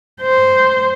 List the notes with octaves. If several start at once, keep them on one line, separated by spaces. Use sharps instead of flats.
C5